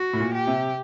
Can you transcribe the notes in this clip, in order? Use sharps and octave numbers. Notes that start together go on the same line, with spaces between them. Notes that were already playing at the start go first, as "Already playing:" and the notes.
Already playing: F#4
A2
A#2
G4
C3